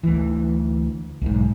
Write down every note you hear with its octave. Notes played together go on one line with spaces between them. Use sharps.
D2 E3
B1 G#2